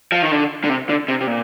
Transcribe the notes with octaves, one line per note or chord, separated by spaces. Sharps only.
F3
D#3
D3
D3
C3
D3
C3
C3
A#2